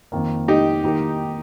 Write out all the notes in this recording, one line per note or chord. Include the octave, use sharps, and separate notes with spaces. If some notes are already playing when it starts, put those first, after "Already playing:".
F2 D#3 A#3
D#4 G4
D#3 A#3 D#4 G4 A#4